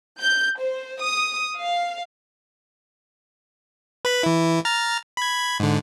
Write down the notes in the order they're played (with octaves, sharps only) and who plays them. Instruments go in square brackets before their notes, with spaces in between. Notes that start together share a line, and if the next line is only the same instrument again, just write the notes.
[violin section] G6
C5
D#6
F5
[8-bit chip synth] B4 B5
E3 E4
A#5 F6 A6
B5 G#6
G#2 D3